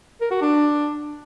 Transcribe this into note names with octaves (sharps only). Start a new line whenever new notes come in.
A#4
F#4
D4